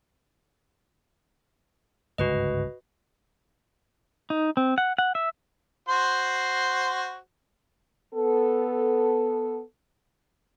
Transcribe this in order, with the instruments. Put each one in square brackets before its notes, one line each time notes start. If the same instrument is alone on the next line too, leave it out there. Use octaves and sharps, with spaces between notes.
[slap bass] G1 C#2 G#2 [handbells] F#4 B4 D#5
[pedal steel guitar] D#4
C4
F#5
F#5
E5
[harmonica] F#4 C5 C6
[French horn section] B3 A4